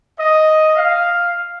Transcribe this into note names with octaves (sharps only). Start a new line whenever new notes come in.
D#5
F5